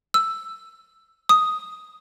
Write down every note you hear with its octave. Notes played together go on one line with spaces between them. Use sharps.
E6
D#6